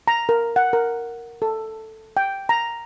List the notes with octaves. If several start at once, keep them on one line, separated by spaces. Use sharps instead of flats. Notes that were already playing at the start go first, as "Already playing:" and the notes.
A#5
A#4
F#5
A#4
A4
G5
A#5